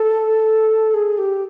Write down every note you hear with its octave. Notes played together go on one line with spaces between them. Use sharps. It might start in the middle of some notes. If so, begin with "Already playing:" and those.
Already playing: A4
G#4
G4